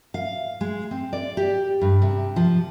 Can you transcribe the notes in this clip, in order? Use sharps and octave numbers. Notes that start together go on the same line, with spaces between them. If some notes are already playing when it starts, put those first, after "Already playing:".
F5
G#3
C4
D5
G4
G2
C3
F3